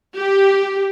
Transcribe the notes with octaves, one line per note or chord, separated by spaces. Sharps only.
G4